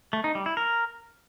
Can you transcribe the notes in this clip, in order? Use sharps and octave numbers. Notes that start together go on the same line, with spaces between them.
A3
D#4
G3
E4
A#4